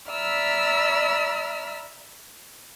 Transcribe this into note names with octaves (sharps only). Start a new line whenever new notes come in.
D5 E5 A#5 B5 E6 F6